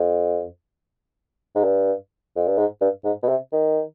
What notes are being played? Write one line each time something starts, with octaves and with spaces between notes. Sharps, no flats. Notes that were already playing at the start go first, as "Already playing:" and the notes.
Already playing: F2
G#2
G2
F2
G2
G#2
G2
G#2
B2
C3
D#3